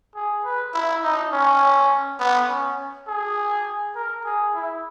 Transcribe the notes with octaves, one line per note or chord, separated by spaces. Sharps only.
G#4
B4
E4
D#4
C#4
B3
C#4
G#4
A#4
G#4
E4